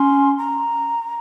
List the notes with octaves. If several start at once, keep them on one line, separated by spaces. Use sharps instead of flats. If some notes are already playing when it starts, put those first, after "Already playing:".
Already playing: C#4 C6
A#5